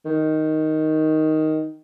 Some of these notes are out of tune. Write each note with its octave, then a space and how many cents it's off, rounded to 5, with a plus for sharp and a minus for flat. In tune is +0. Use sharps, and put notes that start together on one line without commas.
D#3 +5